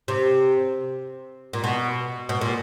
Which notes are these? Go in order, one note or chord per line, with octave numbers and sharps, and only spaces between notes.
C3
A#2
B2
B2
A#2